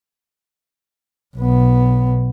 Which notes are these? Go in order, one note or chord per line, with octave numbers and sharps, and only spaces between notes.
B1 B3